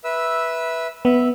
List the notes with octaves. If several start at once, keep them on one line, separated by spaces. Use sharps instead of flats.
B4 E5 E6
B3 E5